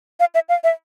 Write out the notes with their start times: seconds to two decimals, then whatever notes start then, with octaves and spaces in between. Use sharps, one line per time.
0.20 F5
0.35 E5
0.49 F5
0.64 E5